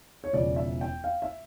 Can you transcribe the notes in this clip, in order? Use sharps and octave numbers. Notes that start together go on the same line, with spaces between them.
C#5
E1 E2 C#3 F3 D5
E5
G5
F5
E5